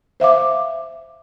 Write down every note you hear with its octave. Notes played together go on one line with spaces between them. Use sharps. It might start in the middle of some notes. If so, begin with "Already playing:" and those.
C5 E5 F5 D6